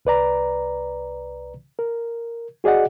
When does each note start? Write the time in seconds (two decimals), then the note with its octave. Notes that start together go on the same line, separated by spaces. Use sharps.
0.05 C2 B4 D5 A#5
1.79 A#4
2.64 F#4 G#4 D5 D#5 F#5